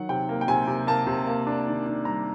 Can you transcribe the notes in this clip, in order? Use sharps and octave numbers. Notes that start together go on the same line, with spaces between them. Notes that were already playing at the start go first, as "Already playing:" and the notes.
Already playing: D#3 F#3 F#5
C3 G5
A#3
G5
C3 G#5
C3
A#3 A5
C3
A#3
D4
D#3
D4
G3 A#5